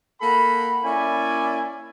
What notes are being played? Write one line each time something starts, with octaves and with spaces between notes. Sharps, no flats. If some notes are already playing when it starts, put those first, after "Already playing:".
A#3 A4 F#5 B5
A#3 C#4 E4 D5 G#5